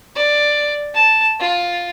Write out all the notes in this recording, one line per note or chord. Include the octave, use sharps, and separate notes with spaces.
D5
A5
F4